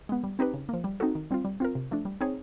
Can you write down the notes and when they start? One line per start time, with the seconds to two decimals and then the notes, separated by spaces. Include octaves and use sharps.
0.09 G#3 B3
0.24 G3
0.39 C4 D#4 G4 B4
0.54 C#3
0.69 F3 A#3
0.84 G3
1.00 C4 D#4 F#4 A4
1.15 D#3
1.31 G3 C4 F4
1.45 G3
1.60 C4 F4 A#4
1.75 C3
1.91 F3 A3 D4
2.05 G3
2.21 C4 D#4 G#4 C#5